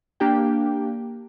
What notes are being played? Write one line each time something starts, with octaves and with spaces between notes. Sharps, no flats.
A#3 D4 G4 G5